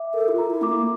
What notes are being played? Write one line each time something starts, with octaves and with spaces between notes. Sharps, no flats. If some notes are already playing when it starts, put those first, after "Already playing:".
Already playing: E5 D6
A4 A#4
E4
F4
A#5
E4
A3 D6
A#3